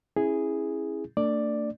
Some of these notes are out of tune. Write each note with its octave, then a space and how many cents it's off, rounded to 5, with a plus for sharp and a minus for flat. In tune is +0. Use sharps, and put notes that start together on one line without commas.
C#4 -30 E4 +0 G#4 -5
A3 +45 D4 +0 D5 +5